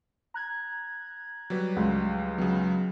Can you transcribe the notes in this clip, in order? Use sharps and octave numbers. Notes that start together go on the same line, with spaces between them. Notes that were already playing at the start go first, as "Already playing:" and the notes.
A#5 F#6 G#6
F#3 G3 B4
C#2
C#3 F#3 B3